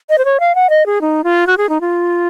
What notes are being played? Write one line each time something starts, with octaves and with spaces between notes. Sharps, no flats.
D#5
C5
C#5
F5
F#5
D#5
G#4
D#4
F4
F#4
G#4
D#4
F4